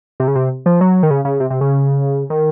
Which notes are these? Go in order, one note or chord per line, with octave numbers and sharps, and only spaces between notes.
C3
C#3
C3
F3
F#3
D#3
C#3
C#3
C3
C3
C#3
D#3